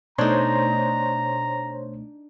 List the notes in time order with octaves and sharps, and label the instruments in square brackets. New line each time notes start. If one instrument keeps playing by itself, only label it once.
[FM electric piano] B2 A3 [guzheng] D4 D#4 [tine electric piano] C5 C#5 C6 [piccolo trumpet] A#5